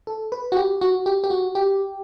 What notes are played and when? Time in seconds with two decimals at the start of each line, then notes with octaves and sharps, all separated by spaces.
0.07 A4
0.32 B4
0.52 F#4
0.57 G4
0.81 F#4
1.06 G4
1.24 G4
1.30 F#4
1.55 G4